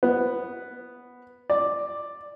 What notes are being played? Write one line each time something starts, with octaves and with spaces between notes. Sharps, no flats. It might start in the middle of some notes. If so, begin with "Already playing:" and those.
B3
D5